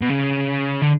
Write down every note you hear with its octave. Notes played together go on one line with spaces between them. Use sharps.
B2
C#3
D3